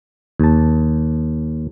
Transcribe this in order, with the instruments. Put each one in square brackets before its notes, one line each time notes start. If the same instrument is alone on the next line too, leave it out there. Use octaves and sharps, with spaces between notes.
[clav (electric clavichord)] D#2 A5